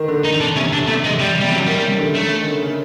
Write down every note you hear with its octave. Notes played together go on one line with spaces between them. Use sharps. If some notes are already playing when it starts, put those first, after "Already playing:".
Already playing: D#3
D3
D#4
D4
C3 C#4
D4
C3 A3
G#3
G3
C3 G3
C#3 F#3
D#3 G3
C3
D3
C#3 A3
D#3
D3
C#3